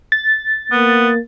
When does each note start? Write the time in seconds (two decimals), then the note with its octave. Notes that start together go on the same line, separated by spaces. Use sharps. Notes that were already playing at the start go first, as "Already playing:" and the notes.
0.12 A6
0.72 A#3 B3